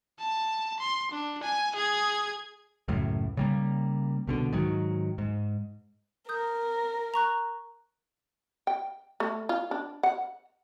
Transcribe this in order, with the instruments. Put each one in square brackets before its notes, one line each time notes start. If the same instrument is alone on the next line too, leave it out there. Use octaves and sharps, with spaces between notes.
[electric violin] A5
C6
D4
G#5
G#4 G#6
[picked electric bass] C#2 F#2 A2
C#3 G3 A#3
C2 B2 D3
G#2 D#3 F#3
G#2
[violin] A#4 [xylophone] D#6 G6
[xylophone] A#5 C#6 F#6
[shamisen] G5
A3
F4
D4
F#5